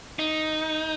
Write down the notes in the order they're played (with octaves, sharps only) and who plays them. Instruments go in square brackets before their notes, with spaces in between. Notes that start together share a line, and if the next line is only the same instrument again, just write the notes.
[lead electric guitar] D#4